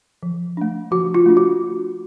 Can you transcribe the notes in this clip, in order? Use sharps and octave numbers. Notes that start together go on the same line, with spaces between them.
F3
A3 D4
F3 F#4
F4
A3 D4
F#4